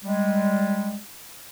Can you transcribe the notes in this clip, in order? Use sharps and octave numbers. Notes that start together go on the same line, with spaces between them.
G3 G#3